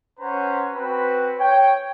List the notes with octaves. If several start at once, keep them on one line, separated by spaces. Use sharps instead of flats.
C#4 B4 C5 F#5 A#5
C4 F#4 B4
C#5 G5